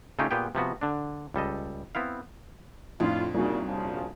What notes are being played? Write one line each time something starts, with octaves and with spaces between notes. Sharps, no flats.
C#3 A3 C#4 D#4 F4 G4
A#2 B3 G4 G#4 G5
C3 F3 B3 F#4
D3 D4
C#2 G3 A4 D#5
B3 C4 E4 F5
F2 A2 D4 F4
C2 A#2 C#3 D#4 F#4
A#1 C#3 F3